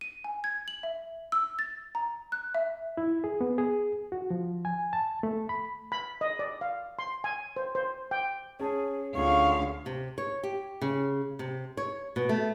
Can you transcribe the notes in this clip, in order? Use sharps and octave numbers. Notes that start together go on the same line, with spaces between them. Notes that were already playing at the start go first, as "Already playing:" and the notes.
D#7
G#5
G#6
F#7
E5
E6
A6
A#5
F#6
E5
E4
G#4
B3
G#4
F#4
F3
G#5
A5
A3
B5
B5
D#5
D5
F5
C6
G#5
C5
C5
G5
C#4 G#4 A5
D2 C#4 F4 G#4 F5 C#6
C3
C#5
G4
C#3
C3
C#5
B2
A3